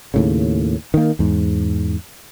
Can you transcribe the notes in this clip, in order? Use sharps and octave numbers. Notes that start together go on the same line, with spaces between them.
D#2 A2 C#3
D#3 A#3
E2 G#2